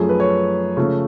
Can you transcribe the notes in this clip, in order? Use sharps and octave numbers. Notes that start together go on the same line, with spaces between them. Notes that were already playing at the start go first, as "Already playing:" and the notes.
Already playing: F#2 F3 A3 G#4
B4
C#5
C#3 F3 A3